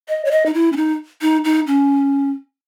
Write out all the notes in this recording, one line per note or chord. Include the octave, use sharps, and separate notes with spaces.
D#5
C#5
D#5
D#4
E4
C#4
D#4
D#4
D#4
C#4